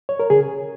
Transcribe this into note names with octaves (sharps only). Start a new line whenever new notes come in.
C#5
A#4
C#3 G#4